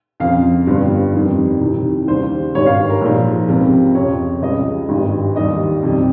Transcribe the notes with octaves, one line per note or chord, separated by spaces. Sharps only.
F2 C#3 F3 F5
G1 G2 G3
F2 D#3 G3
C2 C3 D#3
D#2 C#3 G3 C5
G#1 G2 G3 C#5
F5
A#4
A#1 G#2 F3
C#2 C3 F3
F2 C#3 F3 C#5
C#2 C#3 G3 D#5
G#1 G2 G3
D#2 D#3 G3 D#5
F2 C3 G3